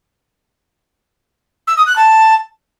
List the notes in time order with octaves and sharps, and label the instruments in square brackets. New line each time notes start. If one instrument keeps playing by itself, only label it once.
[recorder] E6
D#6
F#6
A5